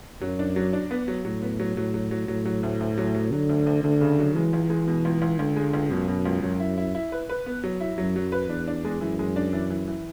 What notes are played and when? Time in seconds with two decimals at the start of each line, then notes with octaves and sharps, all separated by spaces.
0.21 F#2 F#3
0.39 D4
0.56 F#3
0.73 D4
0.91 B3
1.08 F#3
1.25 A2 F#3
1.42 B3
1.60 F#3
1.76 A2 F#3
1.94 F#3
2.11 F#3
2.28 A2 F#3
2.46 F#3
2.63 D2
2.80 D2
2.98 F#3
3.15 F#3
3.32 D3 F#3
3.49 D2
3.66 D2
3.84 D2 D3
4.01 C#3
4.19 F#3
4.35 E3 G#3
4.53 C#2
4.70 G#3
4.87 B2
5.05 C#2
5.22 C#2
5.39 C#2 D3
5.56 G#3
5.74 C#2
5.91 F#2 B2
6.08 B2
6.26 C#2
6.43 F#2 F#3
6.60 E4
6.78 E4
6.95 E4
7.12 B4
7.29 B4
7.46 B3
7.64 F#3
7.81 E4
7.98 F#2 F#3
8.16 F#3
8.32 B4
8.49 E2 D4
8.68 D4
8.85 G#3
9.01 F#2 E3
9.19 G#3
9.36 D4
9.53 E3
9.70 E3
9.88 E3